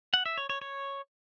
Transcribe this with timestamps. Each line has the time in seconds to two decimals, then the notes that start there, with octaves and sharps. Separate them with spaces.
0.14 F#5
0.26 E5
0.38 C#5
0.50 C#5
0.62 C#5